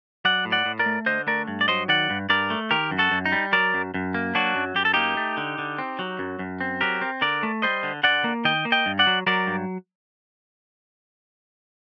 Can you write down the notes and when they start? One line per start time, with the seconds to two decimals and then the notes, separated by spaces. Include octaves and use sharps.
0.25 F#3 D5 F#5
0.45 A2
0.52 D5 F#5
0.65 A2
0.79 A#4 D5
0.86 A3
1.06 D3 C5 D#5
1.27 A3 A#4 D5
1.48 G2
1.61 D5
1.68 F#3 C5 D#5
1.88 D#3 D5 F#5
2.10 G2
2.29 G2 A#4 D5
2.50 A3
2.71 D#3 G4 A#4
2.91 F#2
2.98 F#4 A4
3.12 F#2
3.26 D#4
3.32 G3
3.53 F#3 A#4 D5
3.74 F#2
3.94 F#2
4.14 A#3
4.35 F#3 D4 F#4
4.55 F#2
4.75 F#2 G4
4.85 A4
4.94 A#3 D#4 G4
5.17 A3
5.37 D3
5.58 D3
5.78 C4
5.99 F#3
6.19 F#2
6.39 F#2
6.61 C4
6.81 F#3 G4 A#4
7.01 C4
7.21 D3 A#4 D5
7.43 A3
7.62 G3 C5 D#5
7.83 D3
8.03 D3 D5 F#5
8.24 A#3
8.45 D#3 D#5 G5
8.65 A#3
8.72 D#5 G5
8.86 G2
8.99 D5 F#5
9.07 F#3
9.27 F#3 A#4 D5
9.47 G2